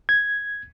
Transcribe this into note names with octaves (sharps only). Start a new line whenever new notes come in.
G#6